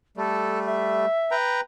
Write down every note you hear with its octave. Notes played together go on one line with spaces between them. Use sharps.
G3 A3 A4
E5
B4 G5 A#5